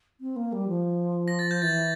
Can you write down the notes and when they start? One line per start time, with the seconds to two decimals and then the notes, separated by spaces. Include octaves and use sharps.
0.21 C4
0.36 A#3
0.53 G3
0.68 F3
1.28 A#6
1.39 A6
1.51 G6
1.62 E3 A6